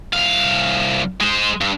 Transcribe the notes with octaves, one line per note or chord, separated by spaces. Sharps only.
C2 F5
G#3 C5
G2